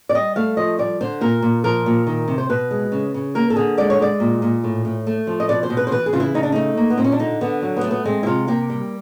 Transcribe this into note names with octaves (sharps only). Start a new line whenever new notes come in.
D5
G3 D#5
A3 F5
F3 D#5
G3 D5
D3 C5
A#2 A#4
A#2
F3 A#4
A#2
D#3
C3
C5
B2 B4
G#3
C#3
C#3
A#3 A#4
A4
D3 G#4
G#3 D5
C#5
G#3 D5
A#2
A#2
A2
A2
A3
F3
D#5
B2 D5
C5
B2
B4
C5
E3 B4
G#4
C#3 F4
E4
C#3 D#4
D4
A3 D#4
A#3
B3
A#2 C4
C#4
D4
D3 D#4
D3 B3
F#3
B3
A3
B3
G#3 C4
E4
C3 F4
A#3 G4
G3